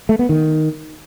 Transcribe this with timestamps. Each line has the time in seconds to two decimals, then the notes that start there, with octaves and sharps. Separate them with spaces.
0.09 A3
0.19 B3
0.29 D#3